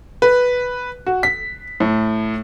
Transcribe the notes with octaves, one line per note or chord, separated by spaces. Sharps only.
B4
F#4
B6
A2